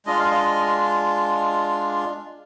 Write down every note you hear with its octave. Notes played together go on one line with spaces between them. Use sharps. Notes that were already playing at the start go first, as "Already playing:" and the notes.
G#3 D4 F4 D#5
F5
D#5